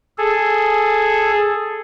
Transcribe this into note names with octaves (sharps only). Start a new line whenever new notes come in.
G#4 A4